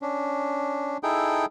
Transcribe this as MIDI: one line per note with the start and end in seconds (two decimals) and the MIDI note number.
0.02 0.97 61
0.02 0.97 62
1.03 1.45 63
1.03 1.45 64
1.03 1.45 68
1.03 1.45 69
1.03 1.45 79